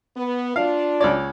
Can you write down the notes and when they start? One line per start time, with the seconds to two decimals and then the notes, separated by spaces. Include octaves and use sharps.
0.16 B3
0.56 D4 F4 F5
1.00 C#2 C#5 D5